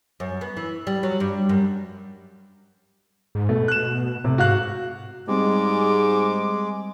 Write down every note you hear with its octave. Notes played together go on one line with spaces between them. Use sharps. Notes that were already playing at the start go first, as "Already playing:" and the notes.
F#2
B3
E3
G3
F#3
G2
F#2
G#2
B2 A3
F#6 E7
A2 C3
G#2 F#4 F5 F#6
G#2 G3 G#3 C4 D6